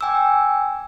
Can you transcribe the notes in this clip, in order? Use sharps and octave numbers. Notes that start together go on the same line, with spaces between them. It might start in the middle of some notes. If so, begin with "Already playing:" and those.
G5 G#5 D6 E6